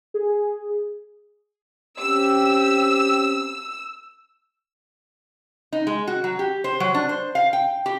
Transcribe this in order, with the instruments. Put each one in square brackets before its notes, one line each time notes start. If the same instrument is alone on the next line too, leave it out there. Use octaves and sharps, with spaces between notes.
[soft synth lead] G#4
[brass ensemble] C4 C#4 G4 [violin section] E6
[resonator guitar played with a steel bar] D#4
G#3
F#4
F#3
G4
C5
F#3
D4
C5
F5
G5
G4